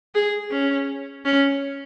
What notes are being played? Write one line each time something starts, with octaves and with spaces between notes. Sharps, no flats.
G#4
C#4
C#4